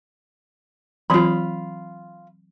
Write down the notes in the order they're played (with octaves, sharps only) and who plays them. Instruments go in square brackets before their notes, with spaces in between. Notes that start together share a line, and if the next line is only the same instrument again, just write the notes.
[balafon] E3 F#3 C4 [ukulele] F4 B5